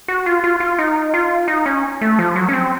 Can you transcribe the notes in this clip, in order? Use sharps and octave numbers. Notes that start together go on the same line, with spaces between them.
F#4
F4
F4
F4
D#4
F4
D#4
C#4
A3
F3
F#3
C#4
C4